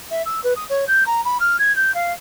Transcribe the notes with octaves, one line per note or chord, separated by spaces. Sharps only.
E5
E6
B4
D#6
C#5
G6
A#5
B5
F6
G#6
G6
F5